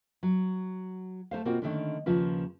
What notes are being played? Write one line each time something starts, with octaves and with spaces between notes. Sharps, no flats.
F#3
A3 D#4 C5 F5
B2 A#3 C4 F4 F#4
D3 D#3 G#3 A3 C#4 D4
D#2 C#3 F3 F4 B4